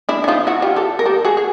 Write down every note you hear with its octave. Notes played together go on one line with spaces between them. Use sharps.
D4 E4
E4
D#4 F4
E4 F#4
F4 G4
G4 A4
A#4
G4 A4
F#4 G#4
G#4